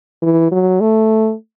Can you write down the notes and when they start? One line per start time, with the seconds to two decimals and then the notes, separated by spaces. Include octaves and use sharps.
0.22 E3
0.51 F#3
0.81 A3